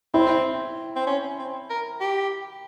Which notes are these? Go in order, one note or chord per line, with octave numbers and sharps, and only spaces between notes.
C4 E4
C4
C#4
C4
A#4
G4